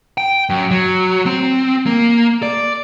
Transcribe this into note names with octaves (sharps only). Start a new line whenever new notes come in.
G5
F#2
F#3
C4
A#3
D5